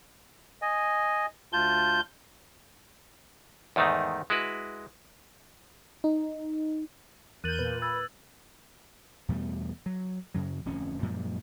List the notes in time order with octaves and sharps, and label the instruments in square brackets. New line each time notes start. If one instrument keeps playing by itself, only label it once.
[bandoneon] D#5 G#5
[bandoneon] D2 F4 A5 [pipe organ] G6
[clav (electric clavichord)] E2 G#2 D#3 A3 D#4
G#3 E4 F#4 B4
[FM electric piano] D#4
[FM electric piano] E2 [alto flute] A#4 [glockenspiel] F#6 A6 F#7 [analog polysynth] G6 D#7
[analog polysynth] A#2 [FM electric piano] B4
[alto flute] B5 [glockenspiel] E6 G#6 A6
[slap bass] E2 B2 G3 A3
F#3
F#2 C#3 F#3
D1 F2 C#4
F#2 A#2 F3 G#3